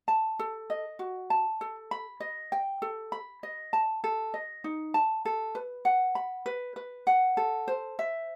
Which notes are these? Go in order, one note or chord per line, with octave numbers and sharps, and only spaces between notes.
A5
A4
D#5
F#4
A5
A4
B5
D#5
G5
A4
B5
D#5
A5
A4
D#5
D#4
A5
A4
B4
F#5
B5
B4
B4
F#5
A4
C5
E5